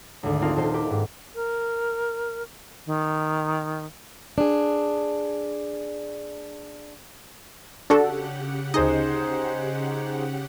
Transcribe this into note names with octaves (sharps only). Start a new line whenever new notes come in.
G#1 D2
A#3 C4 D#4 F4 A4 A#4
D#1 C5
E4 G4
G#2
A#4
D#3
D4 G#4
C#3 D4 F#4 G4 A4 F#5
D2 D#4 G#4 C5 D#5